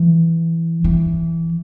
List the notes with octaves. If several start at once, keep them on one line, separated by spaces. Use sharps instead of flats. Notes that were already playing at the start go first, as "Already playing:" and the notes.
Already playing: E3
E3